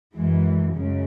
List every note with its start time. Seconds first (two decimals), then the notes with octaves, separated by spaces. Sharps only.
0.16 F#2 E3 G#3
0.76 F#2 C#3 G#3